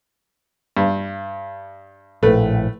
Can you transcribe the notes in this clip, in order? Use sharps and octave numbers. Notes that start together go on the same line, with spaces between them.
G2
A#1 A2 A3 B4